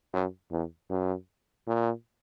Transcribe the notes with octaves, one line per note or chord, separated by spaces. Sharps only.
F#2
E2
F#2
A#2